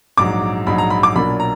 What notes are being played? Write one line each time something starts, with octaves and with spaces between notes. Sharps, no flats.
A#1 G#2 F#3 D6
A#1 G#2 F#3 B5
A#5
B5
D6
B1 A#2 F#3 A#3 D4 B5
A#5